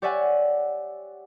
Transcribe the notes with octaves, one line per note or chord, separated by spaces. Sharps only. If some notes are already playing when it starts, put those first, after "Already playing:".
G4 C#5 D5 E5 F#5 G#5